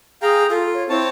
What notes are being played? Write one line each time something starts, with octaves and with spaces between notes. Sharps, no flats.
G#4 F5 G5 A#5
F4 A4
C#5
C4 E4 C#5 A5